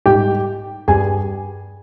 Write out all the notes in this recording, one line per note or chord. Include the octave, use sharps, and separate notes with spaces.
G#2 G3 G4 G5
G2 G3 G#4 G#5